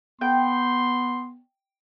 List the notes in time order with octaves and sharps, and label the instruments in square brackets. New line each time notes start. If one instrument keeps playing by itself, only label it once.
[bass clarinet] B3 [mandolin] G5 [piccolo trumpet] C6